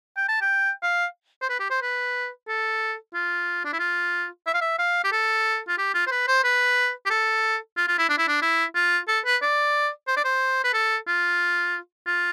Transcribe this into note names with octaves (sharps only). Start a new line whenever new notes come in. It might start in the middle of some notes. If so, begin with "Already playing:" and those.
G5
A5
G5
F5
C5
B4
G4
C5
B4
A4
F4
D4
E4
F4
E5
F5
E5
F5
G4
A4
F4
G4
F4
C5
B4
C5
B4
G4
A4
F4
F4
E4
D4
E4
D4
E4
F4
A4
B4
D5
C5
D5
C5
B4
A4
F4
F4